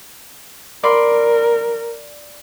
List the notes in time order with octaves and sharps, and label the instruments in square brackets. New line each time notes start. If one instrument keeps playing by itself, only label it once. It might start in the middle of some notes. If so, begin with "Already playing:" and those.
[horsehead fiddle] A#4 [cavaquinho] D5 B5 C6